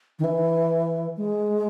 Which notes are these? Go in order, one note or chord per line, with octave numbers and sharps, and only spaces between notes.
D#3
E3
G#3